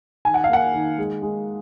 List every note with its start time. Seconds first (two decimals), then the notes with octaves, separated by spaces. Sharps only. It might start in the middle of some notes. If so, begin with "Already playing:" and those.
0.25 D#3 G#5
0.34 F#5
0.44 F5
0.50 A#3 F#5
0.74 D#3
0.98 G#3
1.22 G#3